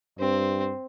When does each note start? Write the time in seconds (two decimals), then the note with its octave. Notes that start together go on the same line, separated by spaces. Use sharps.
0.19 G2 C4